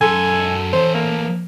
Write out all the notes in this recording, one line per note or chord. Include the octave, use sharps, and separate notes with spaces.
F#2 A4 G#5 C6
E3 C5 C#5
A#3